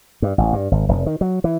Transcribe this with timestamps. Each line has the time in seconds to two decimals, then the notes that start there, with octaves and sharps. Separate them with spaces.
0.22 G2
0.38 A1
0.53 G2
0.71 G#1
0.89 F1
1.06 D#3
1.21 F#3
1.44 E3